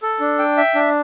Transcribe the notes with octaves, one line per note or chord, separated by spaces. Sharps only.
A4
D4
G5
E5
D4